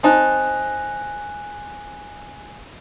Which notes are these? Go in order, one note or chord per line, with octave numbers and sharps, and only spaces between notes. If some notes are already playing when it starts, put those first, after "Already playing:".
C4 D#4 G#5 A5 F#6